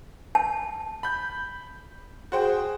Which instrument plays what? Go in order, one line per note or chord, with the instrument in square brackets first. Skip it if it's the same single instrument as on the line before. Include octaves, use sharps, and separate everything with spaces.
[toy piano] A5
[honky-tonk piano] B5 G6
[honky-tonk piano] F#4 C5 G5 [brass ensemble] G#4